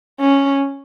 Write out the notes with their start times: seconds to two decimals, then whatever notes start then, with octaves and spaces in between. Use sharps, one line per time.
0.20 C#4